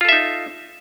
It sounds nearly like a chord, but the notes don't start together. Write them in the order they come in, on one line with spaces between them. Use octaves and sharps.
F4 A4 E5 D#4